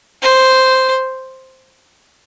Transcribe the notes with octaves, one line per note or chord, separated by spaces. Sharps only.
C5